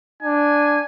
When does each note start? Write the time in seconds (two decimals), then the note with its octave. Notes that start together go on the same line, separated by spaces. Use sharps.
0.22 D4 G#5